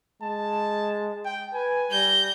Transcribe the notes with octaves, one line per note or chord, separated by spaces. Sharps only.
G#3 A5
G5
B4 G#5
G3 G6 A#6